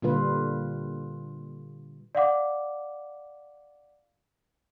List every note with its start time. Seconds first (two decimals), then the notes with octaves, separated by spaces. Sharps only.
0.02 A#2 D3 G3 F4 B4
2.15 D5 F5 F#5 D6